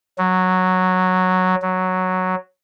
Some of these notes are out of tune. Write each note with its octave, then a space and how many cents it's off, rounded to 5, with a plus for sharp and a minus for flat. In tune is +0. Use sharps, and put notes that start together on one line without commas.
F#3 -5
F#3 +0